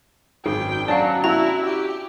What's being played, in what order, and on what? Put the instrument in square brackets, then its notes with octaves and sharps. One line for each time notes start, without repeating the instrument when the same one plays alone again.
[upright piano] G#1 F#2 [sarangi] G5
[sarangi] F#3 [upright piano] C#4 D4 G#5 [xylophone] D5 F5 [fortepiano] A5
[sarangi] E4 [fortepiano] F#4 [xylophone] A#5
[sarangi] G4